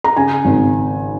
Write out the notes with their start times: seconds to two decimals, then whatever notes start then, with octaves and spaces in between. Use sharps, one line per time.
0.04 A#5
0.17 C#3 G#5
0.44 G#1